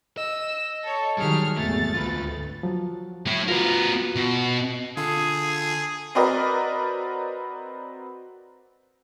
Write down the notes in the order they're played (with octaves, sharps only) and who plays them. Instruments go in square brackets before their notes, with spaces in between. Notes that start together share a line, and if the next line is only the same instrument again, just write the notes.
[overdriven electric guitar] D#5 [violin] E6
[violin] A4 C#5
[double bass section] D#3 F#3 [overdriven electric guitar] G3 [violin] G#4 F6
[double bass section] G#1 E2 [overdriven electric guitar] A3 [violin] A6
[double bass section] D2 [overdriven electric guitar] F4 B4
[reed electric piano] F3 F#3
[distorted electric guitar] E4 C#5
[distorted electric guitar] B3 A#4 [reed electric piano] F4 F#4 B4
[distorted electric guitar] B2
[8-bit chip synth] D3 F4 A4 [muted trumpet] G#4
[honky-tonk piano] C4 F#4 A#4 B4 D5 D#5